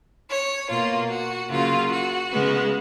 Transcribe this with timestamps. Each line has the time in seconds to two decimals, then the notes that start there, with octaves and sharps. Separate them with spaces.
0.29 C#5
0.69 B2 A#3 F4
1.10 F#4
1.50 C#3 F#3 A#3 F4
1.91 F#4
2.31 C#3 G#3 B3